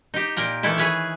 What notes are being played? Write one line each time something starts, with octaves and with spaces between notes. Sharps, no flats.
D#4 G4
A#2 A#4 G5 A#5
D#3 E3 A3 E4 A4 E5
G#4 B4 C#5